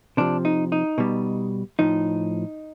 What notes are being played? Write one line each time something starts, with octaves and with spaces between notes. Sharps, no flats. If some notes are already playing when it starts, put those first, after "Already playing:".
C3 F3 D4
D#4
D#4
B2 G3
A2 F3 D#4